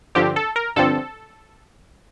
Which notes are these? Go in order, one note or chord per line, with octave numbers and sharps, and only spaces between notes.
G2 D3 F3 C4 G4
A4
A#4
G2 D3 F3 C4 A4